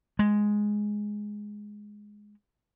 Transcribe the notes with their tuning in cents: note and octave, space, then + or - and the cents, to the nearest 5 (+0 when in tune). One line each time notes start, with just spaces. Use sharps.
G#3 +0